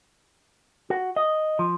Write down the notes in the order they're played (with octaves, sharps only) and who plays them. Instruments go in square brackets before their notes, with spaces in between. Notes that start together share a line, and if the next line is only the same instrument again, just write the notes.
[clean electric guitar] F#4
D#5
F3